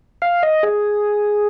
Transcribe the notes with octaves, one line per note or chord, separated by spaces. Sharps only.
F5
D#5
G#4